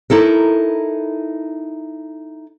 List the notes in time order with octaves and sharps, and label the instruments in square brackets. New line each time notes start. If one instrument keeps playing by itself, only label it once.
[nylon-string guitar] D#4 E4 A4 A#4